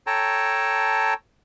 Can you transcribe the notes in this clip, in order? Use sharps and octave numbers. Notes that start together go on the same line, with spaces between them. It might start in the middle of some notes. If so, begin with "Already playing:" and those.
A4 C#5 G5 A5 A#5